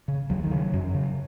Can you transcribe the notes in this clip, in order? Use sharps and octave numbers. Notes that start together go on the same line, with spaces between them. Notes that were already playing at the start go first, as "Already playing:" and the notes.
C#3
D#2 F#3
D#3
C#3
F#3
F#2
C#3